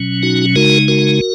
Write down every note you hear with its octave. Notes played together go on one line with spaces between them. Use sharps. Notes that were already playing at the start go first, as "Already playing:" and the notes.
Already playing: B2 F#3 C#4
D#4 F#4
C#3 G#3 D#4 F#4 A#4
F#4 A#4